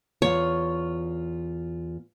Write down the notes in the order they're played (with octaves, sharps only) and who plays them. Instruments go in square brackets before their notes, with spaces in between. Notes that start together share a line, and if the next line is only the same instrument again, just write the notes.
[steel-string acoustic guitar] E2 F4 [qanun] C#5